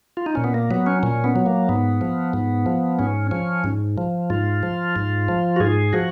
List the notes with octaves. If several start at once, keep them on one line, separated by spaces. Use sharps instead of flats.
F4
D#4
A#2 C#4
B3
A#3
F#3 B3
C#4
A#2 C#4
B3
F#3
A#3
G#2 B3
F3
G#2
F3
G#2 C#4
F3 C#4
G#2
F3
G#2 F4
F3
G#2
F3
F#4
G#2 G#4
F3 F#4